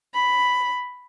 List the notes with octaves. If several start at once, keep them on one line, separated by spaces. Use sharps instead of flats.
B5